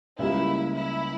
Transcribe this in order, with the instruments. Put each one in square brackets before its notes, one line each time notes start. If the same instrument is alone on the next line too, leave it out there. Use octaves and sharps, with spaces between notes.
[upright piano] C#2 C#3 G3 A#3 [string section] E4
[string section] E4